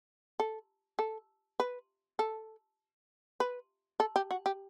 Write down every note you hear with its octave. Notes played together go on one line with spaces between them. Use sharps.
A4
A4
B4
A4
B4
A4
G4
F#4
G4